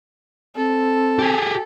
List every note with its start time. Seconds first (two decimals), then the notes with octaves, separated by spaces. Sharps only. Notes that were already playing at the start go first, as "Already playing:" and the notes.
0.57 C4 A4
1.19 G4 G#4